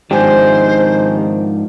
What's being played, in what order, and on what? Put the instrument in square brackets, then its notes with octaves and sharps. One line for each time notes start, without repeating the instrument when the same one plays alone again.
[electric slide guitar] G#2 F3 D4 [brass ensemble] D#3 C4 [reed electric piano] G4 G#5 [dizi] C5